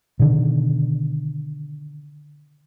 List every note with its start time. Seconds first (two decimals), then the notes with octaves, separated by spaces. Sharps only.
0.19 B2 D3 D#3